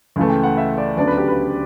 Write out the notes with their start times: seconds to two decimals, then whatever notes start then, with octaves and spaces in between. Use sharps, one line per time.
0.16 C#2 C#3 E3 A3
0.30 G5
0.43 F#5
0.57 E5
0.78 D5
0.97 D2 C#3 F#3 B3 D4 D5
1.07 B4
1.18 G4
1.28 B4